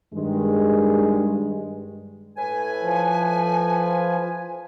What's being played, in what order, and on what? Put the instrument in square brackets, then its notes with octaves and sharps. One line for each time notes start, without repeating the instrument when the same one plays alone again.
[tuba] G2 [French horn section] D#3 G#3
[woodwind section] A2 B4 G#5
[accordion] F3